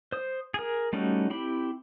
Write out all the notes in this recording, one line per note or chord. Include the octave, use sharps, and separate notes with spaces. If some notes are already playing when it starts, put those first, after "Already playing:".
C5 D#6
G#4 A#4
G3 A3 C#4 D#4 F#4
C4 E4 G4 B5